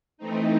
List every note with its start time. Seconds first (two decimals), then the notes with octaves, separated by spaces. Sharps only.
0.18 E3 A3 C4 D#4